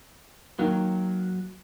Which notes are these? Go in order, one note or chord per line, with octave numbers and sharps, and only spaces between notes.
D#3 F#3 A#3